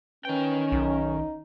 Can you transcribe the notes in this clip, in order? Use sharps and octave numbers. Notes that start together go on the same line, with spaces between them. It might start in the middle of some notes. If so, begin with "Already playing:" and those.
D#3 C#4 B4 G5
B1 D#4